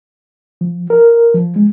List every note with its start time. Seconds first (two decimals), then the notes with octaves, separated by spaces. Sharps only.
0.61 F3
0.90 A#4
1.35 F3
1.56 G#3